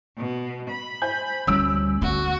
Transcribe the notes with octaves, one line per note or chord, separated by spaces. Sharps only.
B2
B5
C5 G#5 G6
D2 G3 C#4 E6 D7
D2 A3 F#4